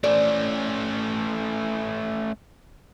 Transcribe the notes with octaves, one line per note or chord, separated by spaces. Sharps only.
A3 C#4 D5